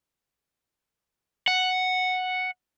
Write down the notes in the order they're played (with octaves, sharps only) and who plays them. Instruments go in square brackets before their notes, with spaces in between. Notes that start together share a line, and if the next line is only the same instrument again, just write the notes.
[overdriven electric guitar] F#5